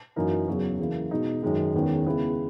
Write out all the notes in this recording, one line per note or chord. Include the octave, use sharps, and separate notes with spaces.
F#2 E3 A#3 D#4 A#4
E2 C#3 F#3
C#3 E3 A#3
B2 G#3 D#4
F#2 D#3 G#3 D#4
E2 D#3 G#3 C#4
C#3 G#3 B3 E4